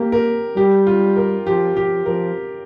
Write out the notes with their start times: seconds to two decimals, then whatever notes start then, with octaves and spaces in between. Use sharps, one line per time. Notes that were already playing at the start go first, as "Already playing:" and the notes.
Already playing: A#3 G4
0.12 A#4
0.57 G3 G4
0.87 F4
1.16 A#4
1.46 F3 G4
1.76 F3 G4
2.06 F3 A#4